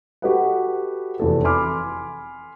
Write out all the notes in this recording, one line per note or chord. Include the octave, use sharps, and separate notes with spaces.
F#4 G4 A4 B4 D#5 F#5
F1 E2 A4
G#5 B5 C6 D6 F6